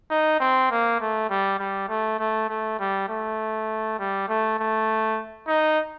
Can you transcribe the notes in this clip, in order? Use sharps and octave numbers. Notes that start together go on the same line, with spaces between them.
D#4
C4
A#3
A3
G3
G3
A3
A3
A3
G3
A3
G3
A3
A3
D#4